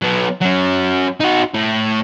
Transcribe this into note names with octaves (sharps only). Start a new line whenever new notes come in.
F#3 B3
F#3 C#4
D#4 F#4
A2